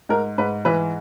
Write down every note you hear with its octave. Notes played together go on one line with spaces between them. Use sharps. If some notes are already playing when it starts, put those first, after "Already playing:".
G#2 A#4
G#2 B4
E3 B4